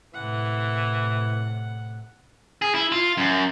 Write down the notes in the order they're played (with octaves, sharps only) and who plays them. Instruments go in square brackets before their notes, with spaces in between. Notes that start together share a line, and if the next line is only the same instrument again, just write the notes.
[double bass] A2 C3 [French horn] E3 [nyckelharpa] F#5
[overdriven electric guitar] G#4
E4
F4
F#2